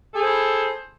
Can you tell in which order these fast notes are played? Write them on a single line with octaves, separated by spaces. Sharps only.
A4 G#4 C5 E4